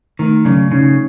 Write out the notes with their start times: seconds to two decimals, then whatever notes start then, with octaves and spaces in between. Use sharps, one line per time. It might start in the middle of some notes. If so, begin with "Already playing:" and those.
0.19 D#3 A3
0.45 C#3 F#3
0.71 C#3 D#4